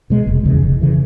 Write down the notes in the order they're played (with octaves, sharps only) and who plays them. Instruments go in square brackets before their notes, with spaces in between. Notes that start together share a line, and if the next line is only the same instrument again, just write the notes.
[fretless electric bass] B2 G#3
F1
D#2 C#3 E3
F1
C#3 E3